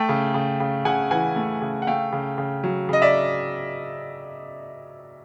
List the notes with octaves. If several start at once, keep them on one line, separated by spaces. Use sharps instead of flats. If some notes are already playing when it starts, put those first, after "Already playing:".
Already playing: A3 G5 A5
C#3
C#3
C#3
C#3 F#5 G#5
E3 F#5 G#5
A3
C#3
F#5
A3 F5 G5
C#3
C#3
F#3
C#3 D#5
D5 E5